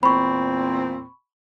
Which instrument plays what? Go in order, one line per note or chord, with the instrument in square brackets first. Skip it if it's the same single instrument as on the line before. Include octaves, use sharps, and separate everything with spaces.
[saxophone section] E2 A#2 C4 [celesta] B5 C#6